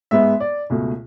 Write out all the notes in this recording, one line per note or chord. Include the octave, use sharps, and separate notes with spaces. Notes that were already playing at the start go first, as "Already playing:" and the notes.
G#2 G#3 B3 E5
D5
C#2 B2 A3